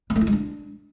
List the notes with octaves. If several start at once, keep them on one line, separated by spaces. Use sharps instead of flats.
A#3
A3
E4
G#3
D4